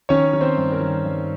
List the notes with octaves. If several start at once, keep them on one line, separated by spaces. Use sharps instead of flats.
D#3 C#4 C#5
D#3
C4 C5
G2
A#4
D#3
G2